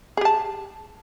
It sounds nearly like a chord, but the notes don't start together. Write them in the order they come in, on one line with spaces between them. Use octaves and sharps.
G#4 G4 A5